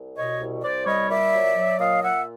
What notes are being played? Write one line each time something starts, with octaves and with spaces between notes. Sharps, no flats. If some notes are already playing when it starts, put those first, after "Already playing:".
Already playing: C2
B2 C#5 D#5
C2
C2 C5 D5
G3 C#5 D#5
A#2 D5 E5
F#3
F#3
A#2 D#5 F5
A#2 E5 F#5